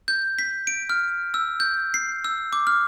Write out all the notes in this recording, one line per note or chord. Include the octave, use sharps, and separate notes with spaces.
G6
B6
D7
F6
E6
G6
C7
E6
D6
F6